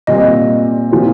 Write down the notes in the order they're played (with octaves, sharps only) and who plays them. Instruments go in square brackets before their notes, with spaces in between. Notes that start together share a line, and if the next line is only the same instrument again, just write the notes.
[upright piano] A#2 G3 C4 [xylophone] D#5
[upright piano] A#2 F3 C4